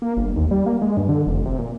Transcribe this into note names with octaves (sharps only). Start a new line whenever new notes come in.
A#3
G1
D#2
G3
A#3
G#3
G2
D3
F1
C3
A#2